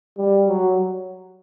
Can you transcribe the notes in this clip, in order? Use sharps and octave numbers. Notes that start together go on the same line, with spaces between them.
G3
F#3